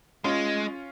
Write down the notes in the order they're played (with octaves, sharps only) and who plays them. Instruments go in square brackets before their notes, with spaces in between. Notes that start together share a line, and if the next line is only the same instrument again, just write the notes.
[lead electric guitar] G#3 [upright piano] C#4 F4